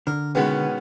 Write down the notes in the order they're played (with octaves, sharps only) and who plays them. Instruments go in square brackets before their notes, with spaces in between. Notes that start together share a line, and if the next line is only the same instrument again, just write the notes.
[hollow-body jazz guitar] D3 [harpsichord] A#4
[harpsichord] B2 D#3 G#3 [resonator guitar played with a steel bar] B3 C#4